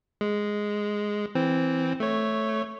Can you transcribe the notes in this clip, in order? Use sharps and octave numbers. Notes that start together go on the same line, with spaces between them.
G#3
E3 C4
A3 C#5